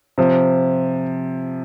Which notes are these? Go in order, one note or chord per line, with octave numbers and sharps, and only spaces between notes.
C3 F3